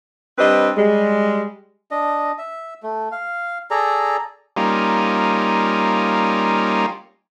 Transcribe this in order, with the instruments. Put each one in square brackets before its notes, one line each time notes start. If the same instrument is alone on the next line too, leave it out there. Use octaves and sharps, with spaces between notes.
[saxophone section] G3 C4 D4 B4 D#5
G3 G#3
[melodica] D4 D#5
E5
A3
F5
G#4 A4 D5 A#5
[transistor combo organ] G3 A#3 C#4 D#4 F4